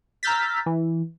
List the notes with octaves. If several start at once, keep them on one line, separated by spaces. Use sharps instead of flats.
A#5 E6 F6 G6 A6 B6
E3